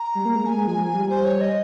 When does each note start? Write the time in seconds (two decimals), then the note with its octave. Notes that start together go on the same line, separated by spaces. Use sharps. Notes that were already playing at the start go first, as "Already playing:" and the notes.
Already playing: A#5
0.15 G3
0.25 A#3
0.35 G#3
0.46 A#3 G#5
0.57 G#3
0.67 F3
0.77 F3
0.94 G3
1.10 C5
1.25 C#5
1.41 D#5